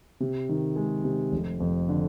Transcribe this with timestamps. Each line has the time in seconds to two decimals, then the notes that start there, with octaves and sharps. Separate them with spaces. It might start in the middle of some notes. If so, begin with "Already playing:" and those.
0.20 C3
0.49 D#3
0.76 G#3
1.04 C3
1.32 F1
1.60 F2
1.89 D3